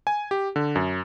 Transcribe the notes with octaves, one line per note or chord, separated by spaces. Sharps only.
G#5
G4
D3
F#2